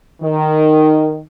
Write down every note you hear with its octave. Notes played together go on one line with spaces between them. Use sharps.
D#3